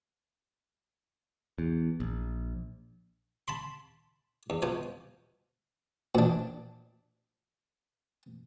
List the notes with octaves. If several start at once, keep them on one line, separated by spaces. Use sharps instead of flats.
E2
A#1
A5 B5 C6
E2
B2 F3 G#5
A#2 D4